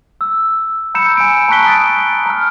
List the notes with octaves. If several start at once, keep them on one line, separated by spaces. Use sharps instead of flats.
E6
A#5 B5 E6 G6 C#7 E7
G#5 D7
A5 A#5 C#6 F#6 B6 G7
D#6 A6 D7
A#5 F6